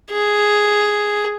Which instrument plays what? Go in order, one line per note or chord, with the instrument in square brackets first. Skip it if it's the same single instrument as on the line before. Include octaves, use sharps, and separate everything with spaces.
[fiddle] G#4